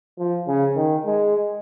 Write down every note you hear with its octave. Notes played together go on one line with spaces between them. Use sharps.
F3
C#3
D#3
G#3